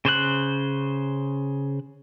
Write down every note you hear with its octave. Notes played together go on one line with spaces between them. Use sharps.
C#3 C5 C#5 F#6